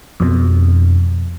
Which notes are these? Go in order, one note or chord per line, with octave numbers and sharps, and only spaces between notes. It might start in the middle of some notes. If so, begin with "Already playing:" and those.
F2 B2